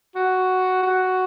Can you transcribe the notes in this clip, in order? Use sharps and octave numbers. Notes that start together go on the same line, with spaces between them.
F#4
F#4